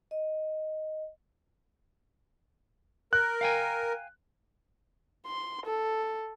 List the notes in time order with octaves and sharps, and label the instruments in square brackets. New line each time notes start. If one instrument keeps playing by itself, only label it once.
[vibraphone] D#5
[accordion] A#4 [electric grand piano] F#6
[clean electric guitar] F5 G5 G#5
[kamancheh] C6
A4